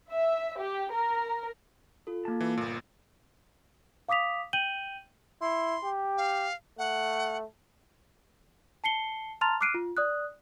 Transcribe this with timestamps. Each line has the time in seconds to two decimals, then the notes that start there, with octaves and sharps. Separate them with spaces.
0.11 E5
0.59 G4
0.93 A#4
2.07 F4 A4
2.25 A#3 A5
2.40 E3
2.57 G1 A#2
4.09 F5 D6 D#6 B6 F7
4.53 G5 G6 D#7 F#7 G7
5.41 E4 C6
5.83 G4
6.17 F5
6.78 A3 F#5
8.84 A5 C7 C#7 G7
9.41 A5 A#5 C6 F6 A6 F7
9.61 D6 F6 F#6 C7 D7 D#7
9.74 F4
9.97 D5 D#6 F#6